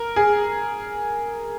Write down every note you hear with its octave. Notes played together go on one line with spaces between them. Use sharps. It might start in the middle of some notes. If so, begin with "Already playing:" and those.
Already playing: A#4
G#4